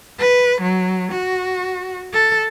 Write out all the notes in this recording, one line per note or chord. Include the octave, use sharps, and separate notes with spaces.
B4
F#3
F#4
A4